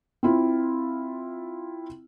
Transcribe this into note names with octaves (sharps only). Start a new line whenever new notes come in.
C4 E4 F4